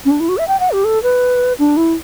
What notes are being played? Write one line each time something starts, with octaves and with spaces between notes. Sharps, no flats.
C#4
D4
E4
F#4
E5
G5
F#5
G4
A4
B4
D4
E4